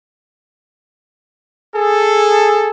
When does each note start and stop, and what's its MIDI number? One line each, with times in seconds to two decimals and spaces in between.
1.74 2.70 68
1.74 2.70 69